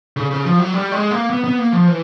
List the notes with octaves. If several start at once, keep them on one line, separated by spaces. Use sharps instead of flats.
C#3
C#3
F3
F#3
G3
G#3
A#3
B3
B3
A#3
F3
E3